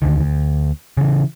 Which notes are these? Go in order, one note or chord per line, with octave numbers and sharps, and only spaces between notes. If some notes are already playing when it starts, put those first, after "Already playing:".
D2 D3 D#3
D2
C#3 E3